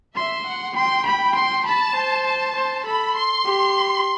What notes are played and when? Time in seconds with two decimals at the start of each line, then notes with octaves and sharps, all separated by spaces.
0.15 E5 C6
0.45 F#5
0.75 G5 C6
1.05 B5
1.35 C6
1.65 A5 B5
1.94 C5
2.25 A5
2.55 C5
2.85 A4 B5
3.15 C6
3.45 G4